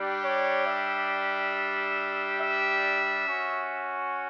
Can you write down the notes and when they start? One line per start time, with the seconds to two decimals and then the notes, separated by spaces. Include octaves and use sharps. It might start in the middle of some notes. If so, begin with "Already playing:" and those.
Already playing: G3 D4 G4
0.23 C#5
0.66 E5
2.40 E5
3.27 C#4 F#4